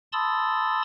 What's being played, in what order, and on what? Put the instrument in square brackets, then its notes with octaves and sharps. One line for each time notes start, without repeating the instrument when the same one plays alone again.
[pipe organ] A5 B5 C6 D#6 E6 A6